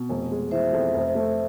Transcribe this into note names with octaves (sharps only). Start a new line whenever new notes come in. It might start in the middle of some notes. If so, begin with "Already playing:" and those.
Already playing: B2
F1
G#3
E3 C5 E5
F2
F1
A3